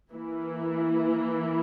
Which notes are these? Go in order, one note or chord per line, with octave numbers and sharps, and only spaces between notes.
E3 A#3 E4